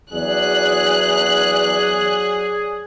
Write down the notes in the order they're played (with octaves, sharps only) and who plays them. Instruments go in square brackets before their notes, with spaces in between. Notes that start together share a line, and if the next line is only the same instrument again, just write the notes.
[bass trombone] E2 [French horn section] F#3 D5 [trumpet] G#4 [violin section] F#6